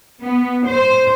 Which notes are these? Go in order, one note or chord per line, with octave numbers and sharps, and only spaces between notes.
B3
C5